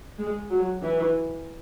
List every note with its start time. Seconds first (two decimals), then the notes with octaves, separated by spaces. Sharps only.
0.18 G#3
0.50 F#3
0.83 E3